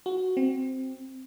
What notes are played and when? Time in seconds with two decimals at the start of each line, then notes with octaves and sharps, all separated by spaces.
0.06 F#4
0.37 C4